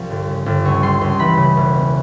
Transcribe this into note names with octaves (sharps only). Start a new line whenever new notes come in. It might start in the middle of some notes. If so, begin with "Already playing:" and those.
Already playing: C2 F3
G1
C#3
G1
C#2 C#6
G3 C6
C#2 C6
E3 B5
C#3
E1
B3